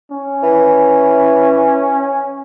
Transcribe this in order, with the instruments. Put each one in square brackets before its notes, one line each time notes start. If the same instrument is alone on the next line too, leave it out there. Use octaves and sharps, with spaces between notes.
[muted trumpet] C#4
[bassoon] E3